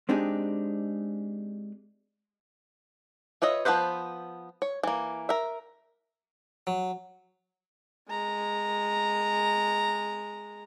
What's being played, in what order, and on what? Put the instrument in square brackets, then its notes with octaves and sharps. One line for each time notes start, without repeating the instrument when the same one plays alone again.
[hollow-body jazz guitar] G#3 C4 D4 D#4 G4 G#4
[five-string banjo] F4 B4 C#5 D#5 E5
F3 A#3 B3 B4 C5
C#5
E3 A#3
A#4 E5
[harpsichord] F#3
[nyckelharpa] G#3 A#5